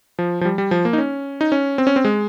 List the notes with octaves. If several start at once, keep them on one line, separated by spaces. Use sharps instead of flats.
F3
F3
G3
G3
F3
A#3
D#4
C#4
D#4
C#4
C4
C#4
C4
G#3